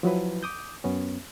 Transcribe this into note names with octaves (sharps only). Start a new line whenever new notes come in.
F3 F#3 E4 B4
D6 D#6 G6
F#2 B3 C#4